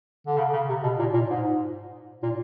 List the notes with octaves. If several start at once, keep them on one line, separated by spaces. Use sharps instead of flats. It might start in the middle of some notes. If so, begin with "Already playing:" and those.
D3
C#3
C#3
C3
B2
A#2
A#2
G#2
A#2